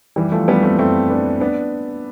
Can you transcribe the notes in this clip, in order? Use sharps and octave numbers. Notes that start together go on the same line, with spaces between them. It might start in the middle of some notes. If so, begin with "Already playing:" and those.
E3 G3
F3 A3
G3 B3
A3 C4
A3 C4
B3 D4
B3 D4